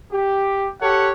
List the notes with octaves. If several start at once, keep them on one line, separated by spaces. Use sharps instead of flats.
G4
G4 A4 C#5 F#5